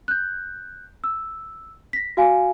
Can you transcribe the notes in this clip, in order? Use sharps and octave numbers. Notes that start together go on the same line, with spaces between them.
F#6 G6
E6
A#6 B6
F#4 F5 G#5